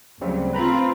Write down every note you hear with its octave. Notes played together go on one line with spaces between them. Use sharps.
D2 C#3 F#3 G3 C4
C4 F4 B4 A#5 B5